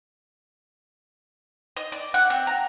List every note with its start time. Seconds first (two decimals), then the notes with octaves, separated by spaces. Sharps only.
1.77 D#5
1.92 D5
2.14 F#5
2.30 C4
2.47 A#5